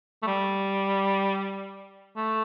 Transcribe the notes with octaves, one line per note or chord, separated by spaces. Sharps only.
A3
G3
A3